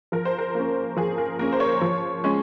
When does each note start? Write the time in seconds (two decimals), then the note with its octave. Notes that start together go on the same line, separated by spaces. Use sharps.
0.12 F3 A#4
0.25 C5
0.38 A#4
0.55 A#3 C#4
0.96 F3 G#4
1.18 A#4
1.39 A#3 C#4 A#4
1.53 C5
1.60 C#5
1.81 F3
2.24 G#3 C#4